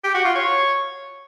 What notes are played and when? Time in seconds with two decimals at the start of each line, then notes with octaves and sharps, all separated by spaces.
0.04 G4
0.14 F#4
0.25 F4
0.35 C#5